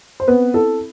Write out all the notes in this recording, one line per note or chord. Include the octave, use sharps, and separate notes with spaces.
C5
B3 C4 B4
E4 A4